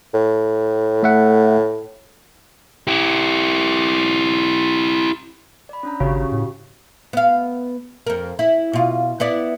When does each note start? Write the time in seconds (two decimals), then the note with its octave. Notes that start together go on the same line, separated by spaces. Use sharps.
0.14 A2
1.03 A3 E5 F#5
2.88 E4 G4
5.69 D5 B5
5.83 C#4 D4 A#5
6.00 G#1 C#3 F#4 G4
6.32 A2
7.13 B3 F5
8.07 F2 A#4
8.39 E4
8.73 B2 F4
9.20 B3 E4 D5